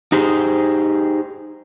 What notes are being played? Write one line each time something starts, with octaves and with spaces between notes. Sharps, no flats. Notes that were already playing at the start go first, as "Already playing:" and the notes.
D#4 G4 G#4 C5